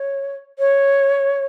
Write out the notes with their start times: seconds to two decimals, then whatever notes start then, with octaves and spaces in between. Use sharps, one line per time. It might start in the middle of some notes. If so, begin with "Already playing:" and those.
Already playing: C#5
0.59 C#5